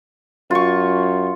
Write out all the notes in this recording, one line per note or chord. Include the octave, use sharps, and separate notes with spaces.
F#2 F4 C#6